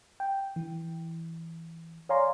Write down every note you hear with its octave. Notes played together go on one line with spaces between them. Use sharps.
G5
E3
C#5 D5 F5 G#5 A#5 C6